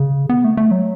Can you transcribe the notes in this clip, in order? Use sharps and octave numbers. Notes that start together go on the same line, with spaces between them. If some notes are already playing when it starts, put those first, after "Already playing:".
Already playing: C#3
B3
A3
A3
F#3